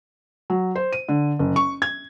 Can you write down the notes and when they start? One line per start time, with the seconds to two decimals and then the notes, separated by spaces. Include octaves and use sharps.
0.50 F#3
0.75 C5
0.93 D#7
1.09 D3
1.39 F#1
1.56 C#6
1.82 G#6